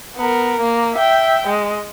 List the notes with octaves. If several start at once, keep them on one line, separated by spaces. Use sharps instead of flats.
B3 A#4
A#3
E5 G5
G#3